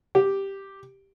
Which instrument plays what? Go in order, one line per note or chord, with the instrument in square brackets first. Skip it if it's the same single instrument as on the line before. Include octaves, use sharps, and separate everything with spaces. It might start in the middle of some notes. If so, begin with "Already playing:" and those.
[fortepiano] G4